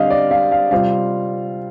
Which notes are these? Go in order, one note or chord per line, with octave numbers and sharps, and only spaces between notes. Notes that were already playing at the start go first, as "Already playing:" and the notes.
Already playing: D3 G3 C4 D#5 F5
D5
F5
F5
C3 G3 C4 F4 F5